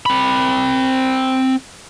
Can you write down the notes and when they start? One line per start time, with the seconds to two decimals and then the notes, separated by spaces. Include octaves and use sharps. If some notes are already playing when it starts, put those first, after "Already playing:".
0.06 C4 B5